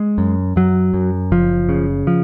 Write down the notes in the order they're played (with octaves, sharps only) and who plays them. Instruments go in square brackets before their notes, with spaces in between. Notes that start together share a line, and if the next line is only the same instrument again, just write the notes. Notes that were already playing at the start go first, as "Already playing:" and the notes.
Already playing: [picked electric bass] G#3
F#2
F#2 F#3
F#2
F#1 F3
C#3
F3